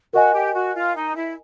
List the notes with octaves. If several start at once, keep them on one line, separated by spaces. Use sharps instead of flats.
F#4 A#4 D#5 G#5
G4
F#4
F4
D#4
E4